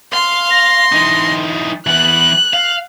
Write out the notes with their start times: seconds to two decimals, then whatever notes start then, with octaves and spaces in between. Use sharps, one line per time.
0.13 F5 C6
0.51 A#6
0.92 E3 D#4
1.87 E3 B3 F#6 F#7
2.54 F5